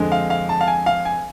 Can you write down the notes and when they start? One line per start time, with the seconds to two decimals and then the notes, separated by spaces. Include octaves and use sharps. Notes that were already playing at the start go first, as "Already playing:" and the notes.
Already playing: F2 D3 G#3
0.12 F5
0.30 F5
0.49 A5
0.61 F5
0.67 G#5
0.86 F5
1.05 G#5